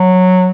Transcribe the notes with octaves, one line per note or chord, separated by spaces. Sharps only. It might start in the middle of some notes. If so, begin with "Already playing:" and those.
Already playing: F#3